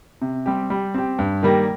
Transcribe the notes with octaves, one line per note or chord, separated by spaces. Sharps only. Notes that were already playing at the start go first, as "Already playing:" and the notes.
C3
G3 C4 G4
G3
C4 G4
G2
D#3 G3 A#3